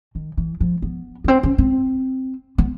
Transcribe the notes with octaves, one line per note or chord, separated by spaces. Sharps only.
D#3
E3
F3
B3
B3
C4
C#4
C4
B3